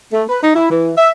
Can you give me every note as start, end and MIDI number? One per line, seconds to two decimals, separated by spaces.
0.12 0.24 57
0.29 0.39 71
0.42 0.52 63
0.55 0.68 64
0.70 0.93 52
0.97 1.09 76